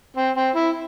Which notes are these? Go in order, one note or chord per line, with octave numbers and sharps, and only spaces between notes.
C4
C4
E4